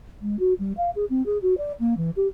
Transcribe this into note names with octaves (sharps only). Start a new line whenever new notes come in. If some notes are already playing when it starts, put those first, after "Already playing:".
G#3
F#4
G3
F5
G#4
C4
G#4
F#4
D5
A#3
E3
G4